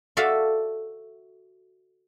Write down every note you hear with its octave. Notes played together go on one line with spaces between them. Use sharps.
F#4 A4 D5 E5 F5